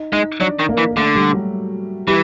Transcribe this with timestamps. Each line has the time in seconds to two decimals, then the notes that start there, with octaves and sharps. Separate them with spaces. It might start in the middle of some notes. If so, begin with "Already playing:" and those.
Already playing: D#4 D#5
0.13 G#3 D#4 D#5
0.41 F#3 D4 D5
0.59 D#3
0.69 A#3 A#4
0.78 E3
0.91 A#4
0.96 D3 A3 A4
1.15 G3 G4
1.33 F#3 F#4
2.07 E3 G3 G4